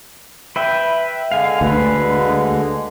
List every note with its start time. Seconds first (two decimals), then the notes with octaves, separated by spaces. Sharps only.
0.56 B4 E5 G5
1.32 D3 G#3 F5 G#5
1.61 D2 B4